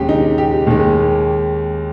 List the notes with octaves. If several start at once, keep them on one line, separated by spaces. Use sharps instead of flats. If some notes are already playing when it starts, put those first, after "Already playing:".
Already playing: D#2 C#3 G#3 G4 G#4
D#4
G4
D#2 D#3 G#3